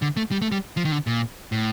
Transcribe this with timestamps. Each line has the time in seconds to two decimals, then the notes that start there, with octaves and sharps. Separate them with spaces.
0.02 D3
0.17 A3
0.32 G3
0.42 A3
0.52 G3
0.77 F3
0.85 D#3
0.92 D3
1.07 A#2
1.52 A2